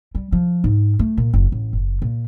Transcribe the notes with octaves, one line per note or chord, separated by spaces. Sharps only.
G3
F3
G#2
A3
A#2
F#1
A1
F#1
A#2